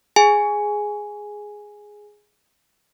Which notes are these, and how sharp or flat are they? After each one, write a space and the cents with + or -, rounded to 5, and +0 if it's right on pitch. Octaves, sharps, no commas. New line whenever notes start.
G#4 +0 G#5 +0